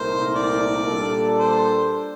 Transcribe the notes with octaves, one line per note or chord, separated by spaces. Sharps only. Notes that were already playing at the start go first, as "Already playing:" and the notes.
Already playing: C2 A#2 A3 D#4 A#4 C5
D5
A#2 G3 D4 A4
C5